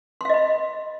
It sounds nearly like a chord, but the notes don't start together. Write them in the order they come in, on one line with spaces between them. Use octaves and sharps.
C6 F5 D#5 B5